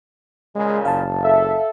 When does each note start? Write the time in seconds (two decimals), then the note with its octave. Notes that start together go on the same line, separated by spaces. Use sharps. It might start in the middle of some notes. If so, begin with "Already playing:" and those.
0.55 A#2 C#3 G#3
0.85 F#1 F5 A5
1.24 A4 E5